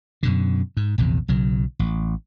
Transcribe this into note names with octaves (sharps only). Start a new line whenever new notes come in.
F#2 B2 D3
G#2
A#1 E2 C3
B1 C#3 F#3
A1